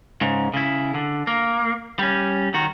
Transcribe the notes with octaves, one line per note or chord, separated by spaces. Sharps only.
G#2 C#3
C#3 E4
D3
A#3
G3 C#4
D#3 F#4